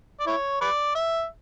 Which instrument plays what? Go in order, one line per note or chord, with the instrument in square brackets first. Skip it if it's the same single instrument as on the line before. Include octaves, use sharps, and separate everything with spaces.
[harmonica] D5
E4 C#5
B4 D5
E5